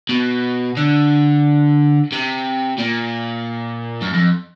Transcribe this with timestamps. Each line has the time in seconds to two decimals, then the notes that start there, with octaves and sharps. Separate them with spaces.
0.09 B2
0.77 D3
2.12 C3
2.79 A#2
4.02 F#2
4.14 F2